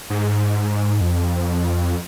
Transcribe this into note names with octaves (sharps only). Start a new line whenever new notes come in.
G#2
F2